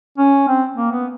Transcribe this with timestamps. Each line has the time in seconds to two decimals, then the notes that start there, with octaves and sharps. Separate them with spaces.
0.18 C#4
0.48 C4
0.76 A#3
0.91 B3